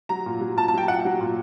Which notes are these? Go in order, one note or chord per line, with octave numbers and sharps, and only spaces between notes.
F#3 A#5
A#2
F#3
A#2 A5
A5
F#3 G5
A#2 F#5
F#3
A#2